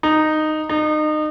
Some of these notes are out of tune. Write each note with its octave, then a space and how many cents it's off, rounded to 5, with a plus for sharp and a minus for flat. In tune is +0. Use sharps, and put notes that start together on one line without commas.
D#4 -10
D#4 -30